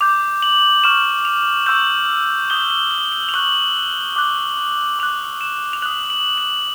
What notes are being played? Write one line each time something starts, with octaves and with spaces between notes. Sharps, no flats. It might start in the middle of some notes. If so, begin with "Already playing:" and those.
D6 G6 F7
F#7
C#6 F6 E7
F7
C#6 E6 G6 F#7
D#6 G6 G7
G7
G7
F#7
F7
C#6 F#6 F#7
D6 F#6
D6 F#6 F7
E7
F7
D#6 F#6 F#7
F#7
F#7